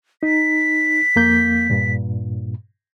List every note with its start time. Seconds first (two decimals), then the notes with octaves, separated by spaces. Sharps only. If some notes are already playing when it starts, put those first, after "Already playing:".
0.23 D#4 B6
1.16 F2 A#3 G6
1.70 G2 A#2